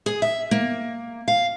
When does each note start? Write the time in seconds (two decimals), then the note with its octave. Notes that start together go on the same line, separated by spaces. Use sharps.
0.06 G#4
0.22 E5
0.51 A#3
1.28 F5